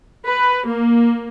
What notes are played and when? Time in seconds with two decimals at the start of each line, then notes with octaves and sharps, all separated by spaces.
0.24 B4
0.66 A#3